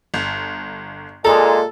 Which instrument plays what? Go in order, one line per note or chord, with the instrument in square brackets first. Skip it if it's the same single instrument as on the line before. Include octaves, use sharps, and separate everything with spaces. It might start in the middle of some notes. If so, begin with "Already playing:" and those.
[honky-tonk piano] G1
[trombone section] A#2 G#3 [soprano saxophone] A4 [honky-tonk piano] A5 A#5